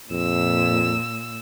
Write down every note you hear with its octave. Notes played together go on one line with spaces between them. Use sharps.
F2 A#2 E6